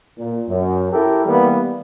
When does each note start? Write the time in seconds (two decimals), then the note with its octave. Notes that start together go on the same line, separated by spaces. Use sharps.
0.18 A#2
0.48 F#2
0.92 E4 G4 A4 A#4
1.25 E3 G3 A#3 B3